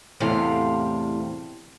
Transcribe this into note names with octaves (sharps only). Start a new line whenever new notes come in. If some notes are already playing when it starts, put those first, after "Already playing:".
E2 A2 C3 G3 F5